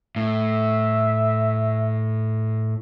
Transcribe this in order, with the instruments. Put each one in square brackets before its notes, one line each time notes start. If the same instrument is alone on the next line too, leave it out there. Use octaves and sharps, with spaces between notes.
[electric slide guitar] A2 [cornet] E5